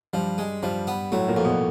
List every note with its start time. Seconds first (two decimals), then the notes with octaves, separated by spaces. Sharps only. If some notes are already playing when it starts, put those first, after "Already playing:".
0.13 G2 F3 G3
0.38 G#3
0.63 G2 F3 G3
0.87 B3
1.12 A2 F#3 A3
1.28 A#2 A#3
1.36 F2
1.45 B2 B3